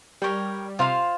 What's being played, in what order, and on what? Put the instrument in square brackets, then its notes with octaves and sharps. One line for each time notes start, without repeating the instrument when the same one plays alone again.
[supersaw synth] G3 [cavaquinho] A#4 C#5 G5
[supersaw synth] C3 [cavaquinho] F4 C5 F5